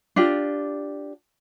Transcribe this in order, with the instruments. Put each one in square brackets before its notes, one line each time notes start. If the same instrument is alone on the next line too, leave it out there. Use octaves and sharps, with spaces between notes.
[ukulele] D4 F4 G4